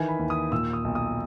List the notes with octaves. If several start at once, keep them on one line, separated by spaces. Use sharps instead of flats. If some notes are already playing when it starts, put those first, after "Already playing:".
Already playing: D#3 E3 G#5
B5
D#2
D#6
A#2 E6
D#6
B1
D#6